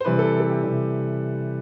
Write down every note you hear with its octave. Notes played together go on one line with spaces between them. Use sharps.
C5
C3 E3 G3 B4
A4
A4
G4
C3 E3 G3